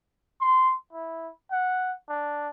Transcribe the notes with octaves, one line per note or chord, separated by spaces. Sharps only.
C6
E4
F#5
D4